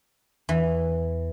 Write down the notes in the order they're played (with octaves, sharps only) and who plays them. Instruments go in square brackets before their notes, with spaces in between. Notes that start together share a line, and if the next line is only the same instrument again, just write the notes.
[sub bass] E2 [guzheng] E3